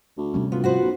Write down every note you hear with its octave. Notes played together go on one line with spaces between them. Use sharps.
D2
C3 G3 C#4
D2 B3 F4
F3 F#4 B4 C5
B1